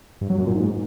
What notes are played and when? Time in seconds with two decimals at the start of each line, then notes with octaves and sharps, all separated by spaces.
0.21 G2
0.30 F#3
0.38 F#2
0.47 A#2
0.55 G#2